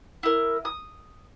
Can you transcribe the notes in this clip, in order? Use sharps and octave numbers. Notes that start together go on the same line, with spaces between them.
E4 A#4
D#6